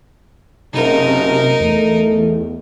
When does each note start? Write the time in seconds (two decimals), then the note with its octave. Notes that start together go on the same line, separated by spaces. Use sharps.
0.74 F#1 C3 D#4 A#4
1.60 E2 A3